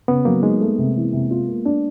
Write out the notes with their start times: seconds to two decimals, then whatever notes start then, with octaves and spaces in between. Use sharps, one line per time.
0.08 C#3 B3
0.25 F#3 A#3
0.43 G#3 D#4
0.61 A3
0.78 C3
0.96 E3
1.13 C3
1.31 F4
1.48 A#3
1.65 D4